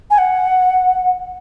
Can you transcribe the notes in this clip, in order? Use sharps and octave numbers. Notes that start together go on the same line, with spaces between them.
G#5
F#5